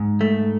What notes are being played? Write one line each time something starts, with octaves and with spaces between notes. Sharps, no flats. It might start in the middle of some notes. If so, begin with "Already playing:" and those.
Already playing: G#2
A3